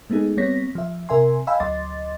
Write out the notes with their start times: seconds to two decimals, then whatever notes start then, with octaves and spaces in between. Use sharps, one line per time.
0.10 G#3 A3 B3 D#4 G#4
0.37 G3 B3 C4 C#5 A#6 B6
0.75 F3 E5
1.09 C3 A#4 E5 G#5 C6
1.47 D#5 F5 G5 G#5 B5 E6
1.60 D2 F#3 D#5 C6 D6 A6